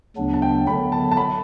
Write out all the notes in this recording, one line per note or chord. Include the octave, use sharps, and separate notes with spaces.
D2 C#3 F#3 B3 D4
A5
G5
D3 F#3 B3 B5
A5
A5
B5